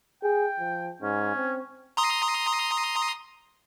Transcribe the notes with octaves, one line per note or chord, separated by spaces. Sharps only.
G#4 G5
F3
G#2 C#4
C4
A#5 C6 D#6